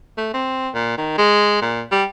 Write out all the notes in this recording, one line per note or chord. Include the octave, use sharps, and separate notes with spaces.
A3
C4
A#2
D#3
G#3
A#2
G3